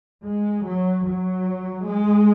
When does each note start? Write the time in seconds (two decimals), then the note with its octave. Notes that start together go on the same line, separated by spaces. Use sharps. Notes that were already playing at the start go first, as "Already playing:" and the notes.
0.23 G#3
0.64 F#3
1.03 F#3
1.85 G#3